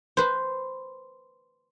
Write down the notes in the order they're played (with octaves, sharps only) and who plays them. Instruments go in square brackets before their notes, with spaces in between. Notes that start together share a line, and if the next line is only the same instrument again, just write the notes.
[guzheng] B4 C5